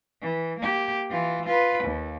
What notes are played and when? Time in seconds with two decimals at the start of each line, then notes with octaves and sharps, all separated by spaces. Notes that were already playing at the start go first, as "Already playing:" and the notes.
0.22 E3
0.60 A#3 G4
1.10 E3 F4
1.46 F4 B4
1.84 D#2